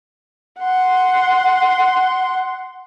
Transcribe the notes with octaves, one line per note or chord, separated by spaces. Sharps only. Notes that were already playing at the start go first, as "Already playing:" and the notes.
F#5 C6